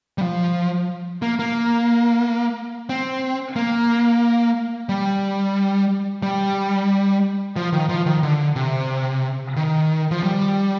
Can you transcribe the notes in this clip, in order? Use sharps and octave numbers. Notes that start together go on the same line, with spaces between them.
G3
F3
A#3
A#3
C4
A#3
G3
G3
F3
D#3
F3
D#3
D3
C3
D#3
F3
G3